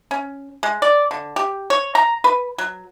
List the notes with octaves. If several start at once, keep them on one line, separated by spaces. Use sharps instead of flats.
C#4
G#3
D5
D3
G4
C#5
A#5
B4
F#3